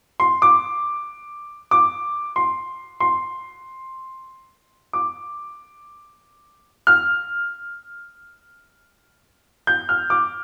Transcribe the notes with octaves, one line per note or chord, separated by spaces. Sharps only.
C6
D6
D6
C6
C6
D6
F6
G6
F6
D6